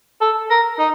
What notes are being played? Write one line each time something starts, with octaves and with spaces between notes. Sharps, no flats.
A4
A#4
D#4